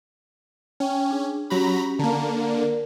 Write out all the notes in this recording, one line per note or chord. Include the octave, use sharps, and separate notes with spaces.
C#4 G5
D4 G#4
F#3 C#4 F#4 G4 A#5 B5
D3 A#3 A5 A#5
A#4 D5